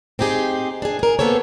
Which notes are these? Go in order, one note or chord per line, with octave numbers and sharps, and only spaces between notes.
C4 D#4 G4 G#4
D4 G#4
G#4 A#4
A#3 B3 A4 C5 C#5